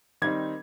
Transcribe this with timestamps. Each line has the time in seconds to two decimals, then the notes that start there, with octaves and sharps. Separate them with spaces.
0.22 D#3 G3 C4 D#4 G#6